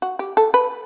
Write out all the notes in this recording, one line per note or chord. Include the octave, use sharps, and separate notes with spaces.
F#4
G4
A4
B4